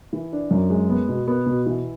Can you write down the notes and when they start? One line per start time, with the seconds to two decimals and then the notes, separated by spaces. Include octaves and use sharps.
0.13 E3
0.33 D4
0.51 F#2
0.70 G#3
0.90 B3
1.09 B2
1.27 B3
1.46 B2
1.66 E3